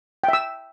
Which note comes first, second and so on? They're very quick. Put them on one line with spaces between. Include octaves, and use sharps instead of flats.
G5 E5 E6